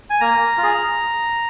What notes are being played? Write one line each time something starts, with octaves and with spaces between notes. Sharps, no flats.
G#5
A#3 A#5
F4
G#4